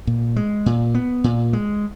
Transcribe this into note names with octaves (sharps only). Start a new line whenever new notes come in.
A#2
G#3
A#2
B3
A#2
G#3